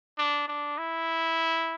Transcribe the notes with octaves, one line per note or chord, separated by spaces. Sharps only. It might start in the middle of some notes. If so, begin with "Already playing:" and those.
D4
D4
E4